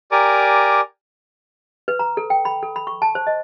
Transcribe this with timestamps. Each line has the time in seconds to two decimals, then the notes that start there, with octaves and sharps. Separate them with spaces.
0.12 G4 A#4 D5 G#5 A#5 D6
1.88 B4
1.99 A#5
2.17 A4
2.30 G5
2.45 B5
2.63 A4
2.76 B5
2.87 C#6
3.02 A5
3.15 C5
3.27 D#5